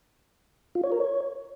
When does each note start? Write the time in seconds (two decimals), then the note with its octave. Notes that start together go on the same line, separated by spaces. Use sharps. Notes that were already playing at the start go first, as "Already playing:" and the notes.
0.75 F4
0.84 C#5
0.92 A#4
1.00 C#5